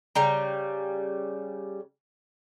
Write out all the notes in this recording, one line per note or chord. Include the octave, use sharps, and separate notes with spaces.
C#3 G3 A#5